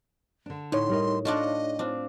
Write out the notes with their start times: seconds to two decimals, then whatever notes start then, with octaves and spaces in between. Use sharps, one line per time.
0.46 D3 D4
0.72 A2 D#4 C#5 C6
0.89 G3 A#4 D#5
1.25 D4 F4 F#4 A4 D#5
1.79 C4 D4 F4